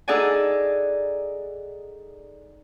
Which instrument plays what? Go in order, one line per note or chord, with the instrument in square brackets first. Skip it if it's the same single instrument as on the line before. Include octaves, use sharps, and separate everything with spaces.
[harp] D#4 G#4 A4 D5 F#5 G#5